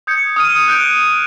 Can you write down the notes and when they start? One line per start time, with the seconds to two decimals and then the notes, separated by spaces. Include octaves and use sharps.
0.07 D#6 G6 G#6 C#7
0.36 D#6 F6 D#7
0.68 F#6 G6 D7